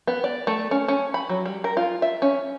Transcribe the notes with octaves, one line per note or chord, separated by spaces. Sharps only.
B3
D5
A3
C#4
C#4
B5
F#3
G3
A#4
F4
E5
C#4